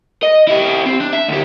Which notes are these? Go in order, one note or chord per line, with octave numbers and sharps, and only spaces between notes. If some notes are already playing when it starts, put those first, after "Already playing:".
D#5
E4 G4
C4
D4
E5
D2 G4